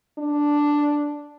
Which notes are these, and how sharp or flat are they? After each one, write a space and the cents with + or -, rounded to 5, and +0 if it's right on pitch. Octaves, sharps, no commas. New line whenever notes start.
D4 +0